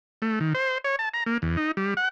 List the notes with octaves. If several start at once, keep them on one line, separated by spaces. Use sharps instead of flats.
A3
D#3
C5
C#5
A5
A#5
A#3
E2
D#4
G3
F#5